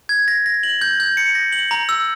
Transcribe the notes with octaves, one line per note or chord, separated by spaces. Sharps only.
G#6
A#6
A#6
F#7
G6
G6
C#7
A#6
F#7
A#5
E6